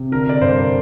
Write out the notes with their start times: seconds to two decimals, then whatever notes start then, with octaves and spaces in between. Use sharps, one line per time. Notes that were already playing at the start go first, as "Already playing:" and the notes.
Already playing: C3
0.12 D3 A#4
0.29 D5
0.41 G2 C5